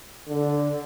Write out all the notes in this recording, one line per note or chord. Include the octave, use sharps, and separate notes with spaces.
D3